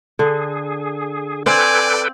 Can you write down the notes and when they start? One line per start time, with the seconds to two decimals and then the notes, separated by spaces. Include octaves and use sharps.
0.19 D3 G#4
1.46 C4 A4 B4 C5 D5 F5 G5 G#5